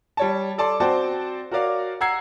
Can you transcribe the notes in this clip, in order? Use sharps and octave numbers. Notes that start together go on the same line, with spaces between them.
G3 C#5 A5
A4 D5 A5 C6
C4 F#4 C5 D5 G5 A5
F#4 A#4 C#5 D5 F5
F#5 A#5 E6 G#6 C7